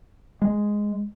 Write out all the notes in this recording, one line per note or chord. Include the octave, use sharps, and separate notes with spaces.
G#3